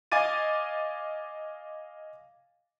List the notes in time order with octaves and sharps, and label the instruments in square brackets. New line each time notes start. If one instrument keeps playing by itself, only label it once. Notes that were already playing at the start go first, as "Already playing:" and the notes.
[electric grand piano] D#5 F5 G#5 D6 A6 D#7